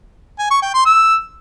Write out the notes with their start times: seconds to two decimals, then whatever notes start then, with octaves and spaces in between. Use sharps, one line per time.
0.39 G#5
0.51 C#6
0.62 G5
0.74 C6
0.86 E6